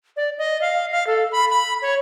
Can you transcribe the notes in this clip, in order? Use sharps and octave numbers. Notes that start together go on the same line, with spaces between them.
D5
D#5
F5
F5
A4
B5
B5
C#5